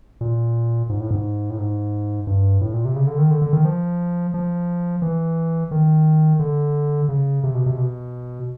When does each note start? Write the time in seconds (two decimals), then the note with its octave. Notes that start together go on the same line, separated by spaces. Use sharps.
0.21 A#2
0.89 G#2
1.00 A2
1.11 G#2
1.50 A2
1.58 G#2
2.27 G2
2.61 A2
2.74 A#2
2.85 C3
2.96 C#3
3.07 D3
3.18 D#3
3.31 D3
3.42 D3
3.53 D#3
3.65 F3
4.34 F3
5.02 E3
5.71 D#3
6.39 D3
7.09 C#3
7.44 C3
7.54 B2
7.66 C3
7.77 B2